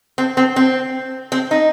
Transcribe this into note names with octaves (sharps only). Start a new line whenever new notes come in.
C4
C4
C4
C4
D#4